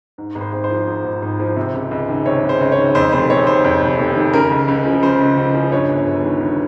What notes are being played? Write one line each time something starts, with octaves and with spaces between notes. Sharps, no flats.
G#2
G#1
C5
G#1
C5
F3
G#2
G#1
G#1
F3
C3
C#2
C#2
D#3
C3 C#5
C#2
C5
C#2
C#5
D#3
F2 C5
F1 C5
F1 C#5
D#3 C5
F2
F1
F1
D#3
C#3 A#4
C#2
C#2
F3
C#3 C5
C#2
C#2
F3
G2 C#5
G1
G1
D#3
G2